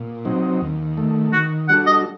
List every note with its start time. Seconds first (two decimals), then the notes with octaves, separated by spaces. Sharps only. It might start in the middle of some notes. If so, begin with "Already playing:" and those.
Already playing: A#2
0.25 F#3 C4 D#4
0.61 D#2
0.97 D#3 A3
1.33 D#3 F#4
1.69 G3 D4 F#4 A4 F#5
1.86 D#5